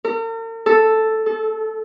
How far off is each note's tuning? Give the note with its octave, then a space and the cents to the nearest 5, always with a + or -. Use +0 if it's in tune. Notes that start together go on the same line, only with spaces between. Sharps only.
A#4 -45
A4 +0
A4 -25